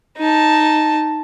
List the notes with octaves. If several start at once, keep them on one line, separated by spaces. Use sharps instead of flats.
D#4 A5